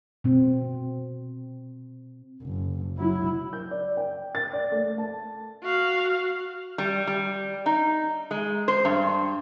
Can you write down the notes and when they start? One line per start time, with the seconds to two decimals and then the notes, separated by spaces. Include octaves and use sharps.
0.24 B2 C4
2.43 F#1
2.97 F#3 E4
3.53 G6
3.71 D5
3.97 G5
4.35 A6
4.53 D5
4.72 A3
4.98 A5
5.63 F#4 F5
6.78 G3
7.07 G3
7.66 D#4
8.31 G#3
8.68 C5
8.85 G2